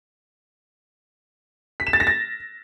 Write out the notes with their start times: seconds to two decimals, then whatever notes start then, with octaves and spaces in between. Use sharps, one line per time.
1.80 B6
1.87 E7
1.93 A6
2.00 A#6
2.07 A6